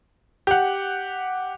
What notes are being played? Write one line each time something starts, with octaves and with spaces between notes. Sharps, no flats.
G4 F#5